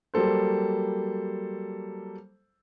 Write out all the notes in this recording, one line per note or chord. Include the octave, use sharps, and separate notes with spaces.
F#3 G3 A#3 A4 C5